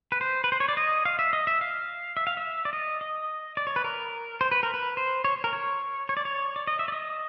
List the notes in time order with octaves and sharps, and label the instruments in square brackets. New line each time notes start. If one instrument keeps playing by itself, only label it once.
[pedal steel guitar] B4
C5
B4
C5
C#5
D5
D#5
F5
E5
D#5
E5
F5
E5
F5
E5
D5
D#5
D#5
D5
C#5
B4
A#4
C5
B4
A#4
B4
C5
C#5
A#4
C#5
C#5
D5
C#5
D5
D#5
E5
D5
D#5